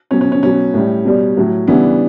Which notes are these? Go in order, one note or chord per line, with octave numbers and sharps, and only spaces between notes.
B2 F#3 C#4
C#4
C#4
B2 F#3 C#4
A2 G3
B2 G3
A2 F#3
C#3 E3 G3 B3 D4